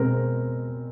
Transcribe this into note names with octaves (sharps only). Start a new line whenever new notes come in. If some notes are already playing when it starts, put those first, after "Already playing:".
Already playing: B2 G#3 C4 A#4